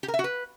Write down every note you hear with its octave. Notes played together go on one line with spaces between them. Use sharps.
G4
A#4
E5
F#4
B4